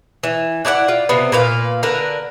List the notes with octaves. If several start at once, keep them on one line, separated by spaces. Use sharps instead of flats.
E3
D4 E4 D5 F#5
F4
C3 B3 C4
A#2 B4 F5
D3 A#4 B4